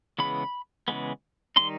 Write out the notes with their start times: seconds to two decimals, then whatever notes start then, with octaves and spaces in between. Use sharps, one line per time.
0.18 C#3 E3 G#3 B3 B5
0.88 C#3 E3 G#3 B3
1.56 D#3 G3 C4 D#4 C6